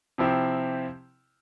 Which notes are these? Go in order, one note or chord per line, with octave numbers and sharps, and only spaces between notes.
C3 F3 C4 E4 G4